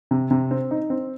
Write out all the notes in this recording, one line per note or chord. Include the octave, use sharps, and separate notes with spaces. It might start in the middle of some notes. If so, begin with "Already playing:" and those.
C3
C3
C4
D#4
C4